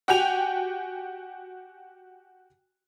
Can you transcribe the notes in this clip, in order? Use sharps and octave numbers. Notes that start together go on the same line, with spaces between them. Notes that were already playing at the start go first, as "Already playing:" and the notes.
F#4 G4 G5 G#5 F7